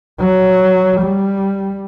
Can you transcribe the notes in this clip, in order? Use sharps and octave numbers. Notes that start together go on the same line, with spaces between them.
F#3
G3